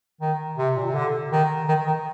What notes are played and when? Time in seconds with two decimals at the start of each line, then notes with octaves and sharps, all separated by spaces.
0.21 D#3
0.58 C3
0.76 A#2
0.86 C3
0.95 D3
1.32 D#3
1.68 D#3
1.87 D#3